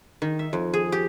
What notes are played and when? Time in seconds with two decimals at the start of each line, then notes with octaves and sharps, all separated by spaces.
0.22 D#3
0.39 E5
0.53 F2
0.73 G#4
0.92 G4